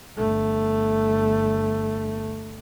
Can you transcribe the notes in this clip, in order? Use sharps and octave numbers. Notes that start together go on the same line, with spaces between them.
G1 A3